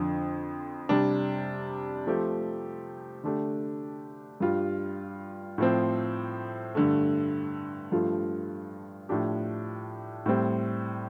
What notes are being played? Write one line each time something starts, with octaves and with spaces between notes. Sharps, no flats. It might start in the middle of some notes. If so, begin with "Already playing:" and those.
Already playing: F2 D3 F3
C3 G3 D4
F3 A3 C4 G4
D3 A3 D4 G4
G2 G3 F4
A2 F3 C4
G2 D3 A3
G2 F3 A3 F4
A2 F3 D4 G4
A2 G3 C4